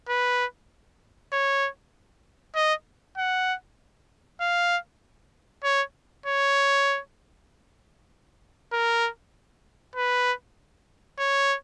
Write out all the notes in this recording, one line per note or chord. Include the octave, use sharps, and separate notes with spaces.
B4
C#5
D#5
F#5
F5
C#5
C#5
A#4
B4
C#5